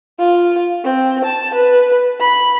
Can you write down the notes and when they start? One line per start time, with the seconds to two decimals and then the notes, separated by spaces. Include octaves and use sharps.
0.19 F4
0.84 C4
1.25 A5
1.54 B4
2.20 B5